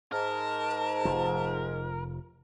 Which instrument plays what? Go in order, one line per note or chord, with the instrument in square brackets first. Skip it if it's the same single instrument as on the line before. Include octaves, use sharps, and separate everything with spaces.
[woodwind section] G#2 [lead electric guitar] A#4 [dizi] A5
[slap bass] F1 F3